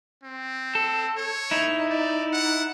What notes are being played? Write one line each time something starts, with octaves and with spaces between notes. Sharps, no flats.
C4
A4
C#5
D#4 E4
D5
F#5